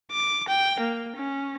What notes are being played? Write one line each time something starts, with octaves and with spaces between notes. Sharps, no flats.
D6
G5
A#3
C#4